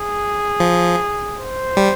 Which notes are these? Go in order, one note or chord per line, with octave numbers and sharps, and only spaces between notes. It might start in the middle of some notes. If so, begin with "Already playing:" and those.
Already playing: G#4
F3
C5
G3